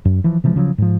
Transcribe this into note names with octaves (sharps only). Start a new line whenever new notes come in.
F#2
E3 F3
C3 E3 F3 G#3
C#3 F3 F#3
G#2 F3